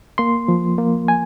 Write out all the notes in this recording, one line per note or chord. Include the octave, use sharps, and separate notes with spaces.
A#3 C6
F3
A#3
G#5